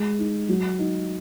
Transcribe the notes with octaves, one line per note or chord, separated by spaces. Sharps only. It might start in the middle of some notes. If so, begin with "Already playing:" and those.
Already playing: G#3
D#4
F#3
D#4